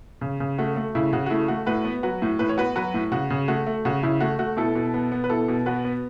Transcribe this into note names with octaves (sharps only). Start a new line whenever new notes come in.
C#3
C#3
A3 F#4
A3
C#3 E4
C#3 F#4
F#4
A3 E4
A3 F#4
A2 F#4 B4
B3
F#3 F#4 B4
A2
A2 B4
C#5
B3 F#4 B4
F#3 F#4 B4
A2
C#3 F#4
C#3
A3 F#4
A3
C#3 F#4
C#3 E4
A3 F#4
A3 F#4
B2 E4 A4
B2
B3
B3
B4
B2 E4 A4
B2
B3 F#4 B4
B3